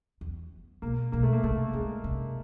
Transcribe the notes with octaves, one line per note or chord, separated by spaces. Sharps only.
E2
B2 A#3
B2 A#3
A3
A#3
C3 A3
C#3 G#3
C3